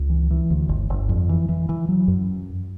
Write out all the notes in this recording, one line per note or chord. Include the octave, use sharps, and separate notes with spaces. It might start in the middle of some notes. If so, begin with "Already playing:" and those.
Already playing: C#2
E3
E3
D2
G1
G1
F2
E3
E3
E3
F#3
F#2